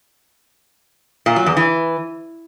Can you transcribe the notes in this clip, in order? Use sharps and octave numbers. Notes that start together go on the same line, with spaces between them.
A#2
F#3
E2
E3